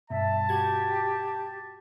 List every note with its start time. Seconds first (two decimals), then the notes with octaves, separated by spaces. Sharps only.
0.10 G2 B2 E5 A5
0.49 F#4 G4 G#6